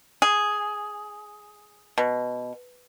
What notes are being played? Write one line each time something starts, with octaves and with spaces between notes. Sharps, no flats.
G#4
B2